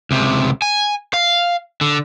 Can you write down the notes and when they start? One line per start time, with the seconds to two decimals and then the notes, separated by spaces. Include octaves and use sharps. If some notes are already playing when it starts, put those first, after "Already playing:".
0.11 C#2 C3
0.62 G#5
1.14 F5
1.81 D3